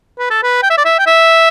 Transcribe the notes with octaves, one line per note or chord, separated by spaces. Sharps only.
B4
A4
B4
G5
E5
D5
E5
G5
E5